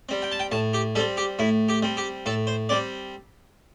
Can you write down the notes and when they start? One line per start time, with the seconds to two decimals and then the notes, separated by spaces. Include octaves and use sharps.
0.09 G3 C4
0.22 G5
0.32 A5
0.40 G5
0.51 A2 A5
0.73 G4
0.95 G3 A4
0.99 C4
1.17 G4
1.39 A2 E4
1.68 G4
1.82 G3 C4
1.97 G4
2.26 A2 A4
2.47 C5
2.69 G3 C4 D5